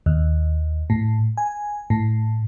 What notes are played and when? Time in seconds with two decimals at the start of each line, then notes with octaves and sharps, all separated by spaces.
0.06 D#2
0.90 A2
1.37 G#5
1.90 A2